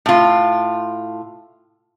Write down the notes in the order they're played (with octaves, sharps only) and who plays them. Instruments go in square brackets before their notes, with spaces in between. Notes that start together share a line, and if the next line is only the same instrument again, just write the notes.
[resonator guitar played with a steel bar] A2 F4